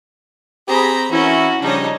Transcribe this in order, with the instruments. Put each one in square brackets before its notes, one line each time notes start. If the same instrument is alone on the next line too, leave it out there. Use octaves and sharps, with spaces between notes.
[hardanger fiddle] C4 [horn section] G4 G#4 [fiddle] A#5 B5
[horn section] E3 E4 [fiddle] C#4 A#4 [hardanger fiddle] F#4
[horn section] C#3 F3 G3 [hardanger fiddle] D4 C#5 [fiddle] D#4 D#5